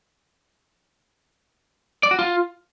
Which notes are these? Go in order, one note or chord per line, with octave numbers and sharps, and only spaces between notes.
D5
F#4
F4